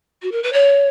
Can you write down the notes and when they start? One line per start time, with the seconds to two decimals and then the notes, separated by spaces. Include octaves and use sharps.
0.22 F#4
0.32 A#4
0.43 B4
0.53 C#5